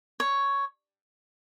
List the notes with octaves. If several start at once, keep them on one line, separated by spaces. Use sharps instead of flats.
C#5